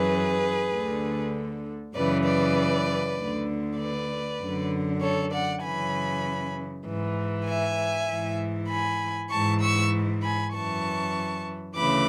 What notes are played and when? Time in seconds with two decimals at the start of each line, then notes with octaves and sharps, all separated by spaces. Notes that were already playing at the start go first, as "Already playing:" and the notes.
Already playing: F#2 E3 G#4 B4
0.72 D2 D3
1.95 F#2 C#3 E3 B4 D5
2.25 B4 D5
3.17 D2 D3
3.79 B4 D5
4.41 F#2 D3
5.01 A4 C#5
5.32 D5 F#5
5.63 F#2 C#3 E3 G#5 B5
6.85 G#2 E3
7.47 E5 G#5
8.09 G#2 E3
8.70 G#5 B5
9.31 G#2 E3 A5 C#6
9.62 C#6 E6
10.23 G#5 B5
10.53 F#2 E3 A5 C#6
11.77 D2 C#3 E3 B5 D6